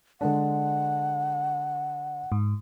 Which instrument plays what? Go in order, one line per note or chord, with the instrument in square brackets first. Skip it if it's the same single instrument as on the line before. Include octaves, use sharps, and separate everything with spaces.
[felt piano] D3 G#3 D4 [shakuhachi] F#5
[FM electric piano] G#2